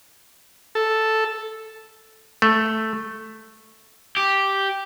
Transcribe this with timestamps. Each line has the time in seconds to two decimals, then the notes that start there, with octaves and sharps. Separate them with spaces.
0.75 A4
2.42 A3
4.17 G4